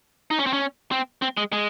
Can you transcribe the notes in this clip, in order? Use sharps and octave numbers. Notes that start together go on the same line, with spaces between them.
D#4
C#4
C4
C#4
C4
C4
G#3
G#3